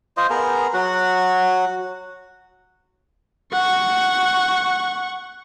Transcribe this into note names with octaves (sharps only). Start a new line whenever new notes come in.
F4 C5 D#5
B3 G#4 A#4
F#3 F#4 F#5
F#5 C#6